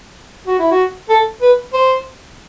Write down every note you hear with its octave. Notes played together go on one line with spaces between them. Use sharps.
F#4
E4
F#4
A4
B4
C5